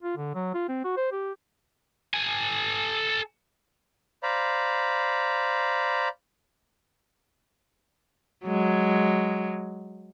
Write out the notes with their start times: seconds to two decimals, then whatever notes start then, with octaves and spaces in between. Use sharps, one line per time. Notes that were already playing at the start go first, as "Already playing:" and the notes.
0.03 F4
0.17 D3
0.35 F#3
0.54 F4
0.69 C4
0.84 F#4
0.97 C5
1.12 G4
2.14 A4 G#5
4.23 C5 D5 F5 A#5 B5
8.45 F#3 G#3